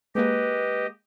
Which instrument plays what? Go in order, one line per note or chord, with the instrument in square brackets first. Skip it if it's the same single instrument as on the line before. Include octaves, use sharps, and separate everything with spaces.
[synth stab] G#3 A#3 [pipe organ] G4 D#5 [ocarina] B4